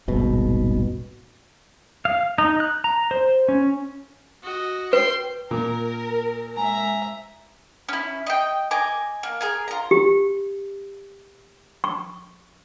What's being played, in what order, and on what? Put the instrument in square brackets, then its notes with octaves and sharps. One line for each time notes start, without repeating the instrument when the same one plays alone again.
[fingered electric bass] D#1 G#1 B2
[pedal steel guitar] F5
D#4
F#6
A#5
C5
C#4
[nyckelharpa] F#4 D#5
[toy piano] B4 [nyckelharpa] G5 C6
[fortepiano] A#2 [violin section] A#4
[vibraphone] G#3 G#5 [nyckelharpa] E5 A#5
[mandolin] C#4 E4
D#5 G5
D#5 G#5 D6
A#3
G#4 A#4 G#5
F4 A#5
[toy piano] G4
C#6